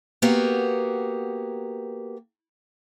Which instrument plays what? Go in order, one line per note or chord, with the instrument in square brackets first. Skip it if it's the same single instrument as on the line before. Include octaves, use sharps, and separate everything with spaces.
[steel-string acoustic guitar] A#3 B3 F#4 G4 A#4